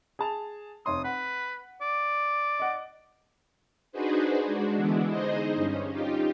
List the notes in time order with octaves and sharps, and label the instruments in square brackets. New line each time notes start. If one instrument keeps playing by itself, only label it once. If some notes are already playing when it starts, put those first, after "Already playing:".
[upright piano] G#4 A5 F7
[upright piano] F1 C#5 C6 [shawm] D#6
[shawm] B4 [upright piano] F#5
[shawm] D5
[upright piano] D#5 F#5
[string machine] D4 D#4 F#4 G#4 B4 C5
G#3 D4 F#4
D3 E3 G#3 B3 D4 E4
D#4 G#4 C5 D#5
G2 C#4
D#4 F4 G4